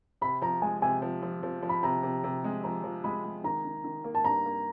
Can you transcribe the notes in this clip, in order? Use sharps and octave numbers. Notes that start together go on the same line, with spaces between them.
C3 B5
F3 A#5
G#3 G#5
C3 G#5
F3
F3
F3
F3
B5
C3 A#5
C3
C3
G#3
F3 A#5
F3
G#3 B5
G#3
D#3 A#5
D#3
D#3
A#3
A5
G2 A#5
A#3